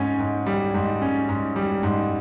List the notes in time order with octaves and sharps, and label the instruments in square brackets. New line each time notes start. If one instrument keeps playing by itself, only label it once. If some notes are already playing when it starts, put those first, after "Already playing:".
Already playing: [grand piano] G#2 C#4
G#2
G3
G#2
C#4
G#2
G3
G#2